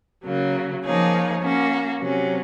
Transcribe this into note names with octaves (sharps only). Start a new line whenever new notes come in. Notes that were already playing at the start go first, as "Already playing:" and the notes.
C#3 F#3 A#3
F3 A#3 D#4 G#4 C#5
A#3 C#4 F#4
C3 F#3 C#4